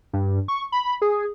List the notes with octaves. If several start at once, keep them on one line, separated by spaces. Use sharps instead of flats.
G2
C#6
B5
G#4